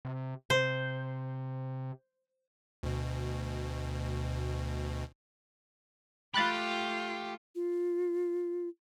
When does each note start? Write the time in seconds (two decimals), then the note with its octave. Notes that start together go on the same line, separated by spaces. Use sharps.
0.05 C3
0.50 C3 C5
2.83 D2 B2
6.34 A3 F4 G4 B5 F#6 A6
7.55 F4